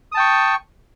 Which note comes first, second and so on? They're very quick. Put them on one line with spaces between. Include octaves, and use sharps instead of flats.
D#6 A5 G5 C#6